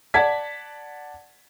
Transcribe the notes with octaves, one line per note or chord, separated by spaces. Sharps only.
D5 F#5 A5 G#6 B6